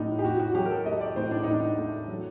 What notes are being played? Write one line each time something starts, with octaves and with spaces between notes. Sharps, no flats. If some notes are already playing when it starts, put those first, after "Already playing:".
Already playing: A2 F#3 D4 D#4
G4
A2 F#4
F#4
F#3 G4
A#4
A4
A3 D#5
D5
A2 C5
D4
A2 D#4
D4
A3
F#3